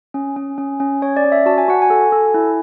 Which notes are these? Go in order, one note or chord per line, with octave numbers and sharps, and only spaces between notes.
C#4
C#4
C#4
C#4
C#4 C#5
D5
C#4
E5
F#4 A5
G#5
F#4 F#5
G#5
A4
A4
E4